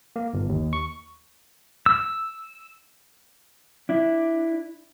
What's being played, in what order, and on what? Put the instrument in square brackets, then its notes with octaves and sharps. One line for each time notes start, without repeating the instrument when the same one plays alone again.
[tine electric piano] A#3
G1
D#2
C#6
[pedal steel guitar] E6
[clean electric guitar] D4 E4